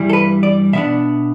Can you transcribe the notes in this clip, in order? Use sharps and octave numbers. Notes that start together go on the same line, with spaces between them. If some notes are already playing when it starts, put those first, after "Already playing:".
Already playing: G2 E3 G3 E4
A4
B4
D5
B2 B3 D4 E5